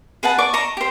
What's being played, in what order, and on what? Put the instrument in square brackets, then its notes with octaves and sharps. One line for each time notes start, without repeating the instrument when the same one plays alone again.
[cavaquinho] G#4 B4 F#5 A5
D5 C#6 D6
D#5 A5 A#5 C#6
G4 C5